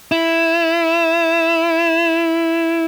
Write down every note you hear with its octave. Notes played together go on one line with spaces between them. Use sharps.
E4